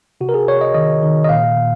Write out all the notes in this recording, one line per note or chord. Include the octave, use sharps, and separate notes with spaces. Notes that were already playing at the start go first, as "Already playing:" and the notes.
C3 F#4
A#4
G#4
C3 C#5
D#5
D#3 D#5
D#3
D#5
A#2 F5
A#2